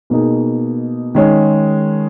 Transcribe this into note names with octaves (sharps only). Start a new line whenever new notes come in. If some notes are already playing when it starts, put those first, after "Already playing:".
B2 A#3 D#4 G#4
D#3 G#3 C#4 G#4